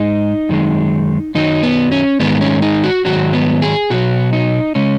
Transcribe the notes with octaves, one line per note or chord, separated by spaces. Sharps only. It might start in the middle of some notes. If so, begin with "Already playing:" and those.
Already playing: G#2 G#3 D#4
F#2 D#3 G#3
F#2 D#3 F#3 D#4
B3
C#4
G#2 D#3 G#3 B3
C#4
D#4
F#4
G#2 D#3 F#3 F#4
B3
G#4
B2 F#3 F#4
D#4
C#3 G#3 C#4